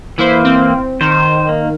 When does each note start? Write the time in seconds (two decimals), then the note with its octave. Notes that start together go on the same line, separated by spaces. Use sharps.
0.18 E3 A#3 E4 C5
0.44 C4
1.01 D#3 C5
1.49 A#3